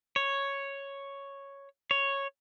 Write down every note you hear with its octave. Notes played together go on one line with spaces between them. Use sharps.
C#5
C#5